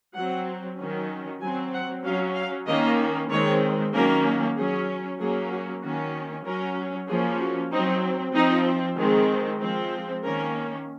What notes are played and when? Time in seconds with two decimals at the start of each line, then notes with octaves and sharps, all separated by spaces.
0.15 F#3 C4 F#5
0.78 D#3 F#3 C#4
1.41 F#3 C4 G#5
1.73 F#5
2.04 F#3 C#4 F5
2.35 F5
2.67 D#3 A#3 C#4 D#5
3.30 D#3 G#3 C4 C#5
3.94 D#3 F#3 A#3 C#4 A#4
4.56 F#3 C#4 G#4
5.20 F#3 A#3 C#4 G#4
5.51 F#4
5.83 D#3 A#3 C#4 F#4
6.46 F#3 C#4 A#4
7.08 F3 A#3 C#4 G#4
7.40 F#4
7.72 F#3 C4 D#4
8.35 F3 C4 D#4
8.98 D#3 G#3 C4 G#4
9.61 F3 G#3 C4
10.24 D#3 A#3 C#4 A#4